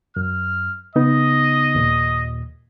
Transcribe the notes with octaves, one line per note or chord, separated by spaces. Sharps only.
F#2 F6
C#3 B3 D#4 D#5
D#2 A#2